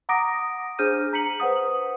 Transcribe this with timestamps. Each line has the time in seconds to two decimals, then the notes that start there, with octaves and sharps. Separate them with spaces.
0.09 F#5 A#5 D6 D#6 A#6 D7
0.79 D4 G#4 C5 F6 G6 D#7
1.13 A#5 B6 C#7 F#7
1.40 B4 C5 F#5 D#6